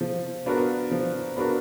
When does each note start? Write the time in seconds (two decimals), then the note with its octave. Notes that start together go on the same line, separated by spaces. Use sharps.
0.01 F3
0.46 B3 D4 F#4 A#4
0.91 F3
1.37 B3 D4 F#4 A#4